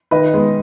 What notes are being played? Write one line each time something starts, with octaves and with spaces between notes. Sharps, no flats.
D#3 B4 D#5
G#3 B3